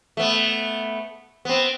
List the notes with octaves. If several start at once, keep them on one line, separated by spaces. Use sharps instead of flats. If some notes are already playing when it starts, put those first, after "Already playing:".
A3 B3
B3 C4